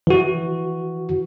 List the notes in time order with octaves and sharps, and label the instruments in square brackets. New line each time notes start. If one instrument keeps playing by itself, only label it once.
[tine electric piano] E3 F#4